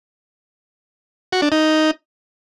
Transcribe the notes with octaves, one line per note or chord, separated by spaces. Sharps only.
F#4
D4
D#4